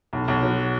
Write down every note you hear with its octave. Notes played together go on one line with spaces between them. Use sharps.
B1
B1
F#3